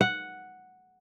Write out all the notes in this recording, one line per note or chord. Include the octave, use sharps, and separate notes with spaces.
F#5